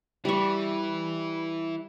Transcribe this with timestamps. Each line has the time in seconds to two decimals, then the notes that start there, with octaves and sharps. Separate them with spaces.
0.25 E3 G3 C#6